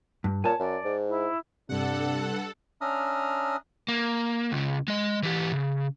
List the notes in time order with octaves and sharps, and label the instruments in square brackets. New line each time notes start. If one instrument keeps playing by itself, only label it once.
[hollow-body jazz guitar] G2
[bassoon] A#2 [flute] C#5 [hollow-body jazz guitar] G#5 A5
[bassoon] F#2 [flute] D5
[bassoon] G#2
[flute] E4
[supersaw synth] G2 F#5 [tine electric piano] C3 [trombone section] D4 [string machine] A4
[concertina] C#4 D4 E5 A#5 D#6 F6
[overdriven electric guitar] A#3
C#2 C#3
G#3 D#5
E3 G4
C#3